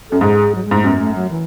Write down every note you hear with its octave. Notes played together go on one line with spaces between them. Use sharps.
F#2 A4
G#2 G#4
F#3
G#3
G#2 A3
F#2 B3
A3
F#3
E3